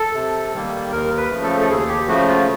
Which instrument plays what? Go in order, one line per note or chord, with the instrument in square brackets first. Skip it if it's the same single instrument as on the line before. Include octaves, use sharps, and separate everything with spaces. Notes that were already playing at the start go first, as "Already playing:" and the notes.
Already playing: [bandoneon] A4
C3
D#3 G3 A#3
D#2 A#4
B4
C#3 F3 A3
A4
A4
D#2 G#4
G4
C#3 F3 A3 F#4
F4